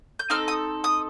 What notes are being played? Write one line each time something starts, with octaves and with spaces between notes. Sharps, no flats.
G6
C4 D#4 A4 F6
D#6
D#6